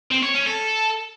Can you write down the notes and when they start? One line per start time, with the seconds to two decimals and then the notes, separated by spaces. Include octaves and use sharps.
0.11 C4
0.23 C#5
0.35 C#4
0.46 A4